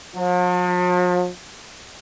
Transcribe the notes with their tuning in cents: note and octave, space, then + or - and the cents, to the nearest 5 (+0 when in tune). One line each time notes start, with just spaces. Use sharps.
F3 +45